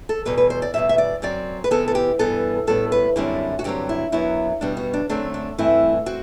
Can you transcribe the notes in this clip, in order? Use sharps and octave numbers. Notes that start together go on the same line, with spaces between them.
A4
E2 B2 G3 B4
B4
C5
D5
E2 B2 G3 B3 E5
E5
D5
F#2 F#3 C4 D5
B4
C3 E3 B3 A4
A4
G4
G2 E3 B3 A4
A2 G3 B3 A4
B4
F#2 D3 G3 C4 E4
F#4
G2 D3 F#3 C4 G4
E4
F#2 F#3 B3 E4
B2 G3 B3 D4
F#4
D4
F#2 D3 A3 C4 D4
D4
G2 E3 A3 C4 E4
C4 F#4